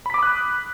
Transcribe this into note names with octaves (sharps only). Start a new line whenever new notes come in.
B5 D6 D#6 F#6 B6